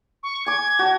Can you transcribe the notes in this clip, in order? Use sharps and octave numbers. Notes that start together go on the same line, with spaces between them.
C#6
G#5 D6 G#6
F#4 A5